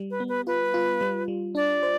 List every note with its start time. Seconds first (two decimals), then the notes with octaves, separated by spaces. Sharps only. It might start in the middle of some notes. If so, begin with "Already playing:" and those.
Already playing: G3
0.10 B4
0.20 B3
0.28 B4
0.47 F4 B4
0.74 F4
1.01 G3
1.28 G3
1.55 D4 D5
1.83 C5